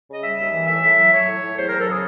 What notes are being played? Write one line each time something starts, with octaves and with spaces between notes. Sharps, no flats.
C#3 D#5
G3 E5
D#2
E3
A2 E5
A2
F#3
F#3 C#5
A2
A2
E2 C5
F#3 A#4
A4
C#3 G#4